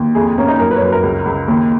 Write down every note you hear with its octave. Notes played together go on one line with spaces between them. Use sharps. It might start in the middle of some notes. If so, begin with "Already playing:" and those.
Already playing: D#2
F2 G#4
G#4
A#3 C#4
D#4
F#2 A#4
B4
C#5
F#2 B4
A#4
C#2
C#2
D#2